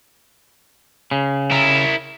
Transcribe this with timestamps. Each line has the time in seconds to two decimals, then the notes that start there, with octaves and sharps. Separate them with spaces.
1.11 C#3
1.51 E4 A#4